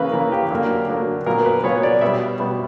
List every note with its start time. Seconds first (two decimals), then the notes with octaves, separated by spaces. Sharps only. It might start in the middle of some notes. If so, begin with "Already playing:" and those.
Already playing: C#3 E3 A#3 B4
0.12 C#3 E3 A#3 A#4
0.32 G4
0.51 D3 F#3 A#3
0.88 D3 F#3 A#3
1.26 A#2 F#3 B3 A#4
1.46 B4
1.64 A#2 F#3 B3 C#5
1.83 D5
2.01 B2 G3 B3 E5
2.40 B2 G3 B3